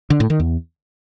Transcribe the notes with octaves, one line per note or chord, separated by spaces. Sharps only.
D3
A2
D#3
E2